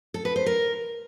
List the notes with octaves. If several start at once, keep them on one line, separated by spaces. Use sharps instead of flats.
A4
B4
C5
A#4